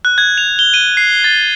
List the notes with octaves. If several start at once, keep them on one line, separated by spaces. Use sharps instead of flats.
F#6
G#6
F7
G7
D#7
C7
A6